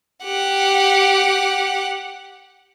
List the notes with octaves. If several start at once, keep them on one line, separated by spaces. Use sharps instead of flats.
G4 F#5